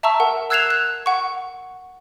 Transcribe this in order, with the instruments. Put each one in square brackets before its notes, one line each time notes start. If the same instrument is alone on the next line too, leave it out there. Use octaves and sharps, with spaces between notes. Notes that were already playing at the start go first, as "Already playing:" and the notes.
[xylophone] E5 A5 A#5 C#6 E6
A#4 F#5
E6 F#6 G#6 C7 E7 F7
F#6
F#5 C#6